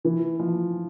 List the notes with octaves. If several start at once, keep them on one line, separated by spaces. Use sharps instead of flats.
E3
F3